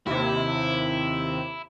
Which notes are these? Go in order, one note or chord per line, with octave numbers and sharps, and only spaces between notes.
D#2 C3 E4